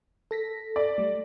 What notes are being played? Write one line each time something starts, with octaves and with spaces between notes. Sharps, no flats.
A4 A#6 B6
D5
G3 A3